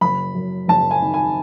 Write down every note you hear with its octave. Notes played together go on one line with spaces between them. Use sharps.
F#1 B5
F#2
F#1 A5
G#5
D#3
G#5